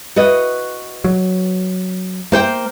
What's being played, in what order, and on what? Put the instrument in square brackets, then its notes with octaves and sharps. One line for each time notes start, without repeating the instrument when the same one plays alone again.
[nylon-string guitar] F#4 B4 D#5
[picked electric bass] F#3
[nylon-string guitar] A#3 C5 G5